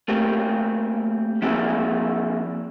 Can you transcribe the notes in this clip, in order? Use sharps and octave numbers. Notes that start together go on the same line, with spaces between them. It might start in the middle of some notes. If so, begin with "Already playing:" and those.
A3 A#3 C4 G4
F3 A#3 C4 E4 F#4 G#4